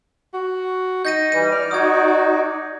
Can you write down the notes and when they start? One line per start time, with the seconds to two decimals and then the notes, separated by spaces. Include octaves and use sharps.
0.34 F#4
1.05 D#4 G6 A#6 D#7
1.32 E3 G3 D#7
1.51 D5 F6
1.71 D#4 F#4 D#6 G#6